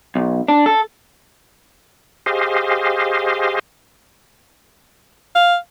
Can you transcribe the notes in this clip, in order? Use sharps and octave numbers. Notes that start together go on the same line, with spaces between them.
B1
D4
A4
G4 G#4 C5 D#5 F5
F5